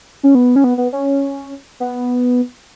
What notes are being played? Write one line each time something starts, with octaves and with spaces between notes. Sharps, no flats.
C#4
B3
C#4
B3
B3
C#4
B3